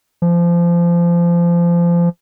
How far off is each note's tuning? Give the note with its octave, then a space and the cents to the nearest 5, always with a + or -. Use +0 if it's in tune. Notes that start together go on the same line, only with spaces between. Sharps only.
F3 -25